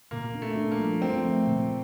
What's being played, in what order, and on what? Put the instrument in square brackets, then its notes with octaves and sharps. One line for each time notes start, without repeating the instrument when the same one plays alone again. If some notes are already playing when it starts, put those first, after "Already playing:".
[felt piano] A#2 [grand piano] A#3
[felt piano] D4
[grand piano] A3
[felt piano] D4
[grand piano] A#3
[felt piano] F3
[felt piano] F3 [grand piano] C4
[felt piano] A3
A#2